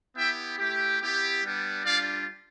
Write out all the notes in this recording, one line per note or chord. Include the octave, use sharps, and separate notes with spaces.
B3 E4 G4 E5 G5
A3 E4 G4
B3 E4 G4
G3 B3 D4
G3 D4 F4 D5 F5